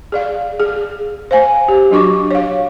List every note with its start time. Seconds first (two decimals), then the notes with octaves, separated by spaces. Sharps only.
0.12 G#4 D5 F5
0.60 G#4
1.31 C5 F5 G#5
1.68 G4
1.91 F#3 D4 F#4 C#6 D6
2.31 C#5 F5